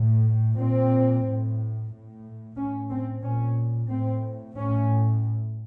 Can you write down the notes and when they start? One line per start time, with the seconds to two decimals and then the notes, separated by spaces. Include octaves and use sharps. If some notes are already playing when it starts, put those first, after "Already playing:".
Already playing: A2
0.56 A#2 C4
1.24 A2
1.90 A2
2.56 A2 C#4
2.91 C4
3.23 A#2 C#4
3.89 A2 C4
4.56 A2 C#4